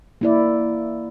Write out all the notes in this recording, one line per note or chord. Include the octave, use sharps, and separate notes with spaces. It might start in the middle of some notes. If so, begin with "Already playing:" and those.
A#3 E4 D5